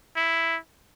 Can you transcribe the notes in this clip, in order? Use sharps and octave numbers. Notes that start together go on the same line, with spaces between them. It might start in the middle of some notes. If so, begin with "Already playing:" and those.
E4